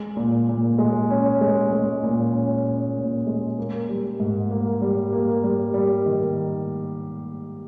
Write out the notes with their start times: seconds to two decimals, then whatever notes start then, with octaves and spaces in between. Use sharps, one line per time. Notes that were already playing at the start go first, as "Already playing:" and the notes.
Already playing: G#3
0.17 A#2
0.49 A#2
0.78 G#3
1.10 C#4
1.41 G#3
1.73 G#3
2.03 A#2
2.34 C#4
2.65 C#4
2.96 A#2
3.27 G#3
3.58 A#3
3.89 G3
4.20 G#2
4.50 A#3
4.82 G3
5.13 A#3
5.44 G3
5.74 G3
6.06 D#3